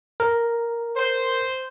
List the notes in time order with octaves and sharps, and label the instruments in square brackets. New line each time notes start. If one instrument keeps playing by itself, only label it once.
[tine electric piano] A#4
[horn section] C5